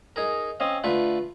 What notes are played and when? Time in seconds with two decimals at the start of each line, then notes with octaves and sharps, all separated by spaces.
0.16 D#4 G#4 A#4
0.60 C4 C#4 D#5 F5
0.84 D3 A3 F4 B4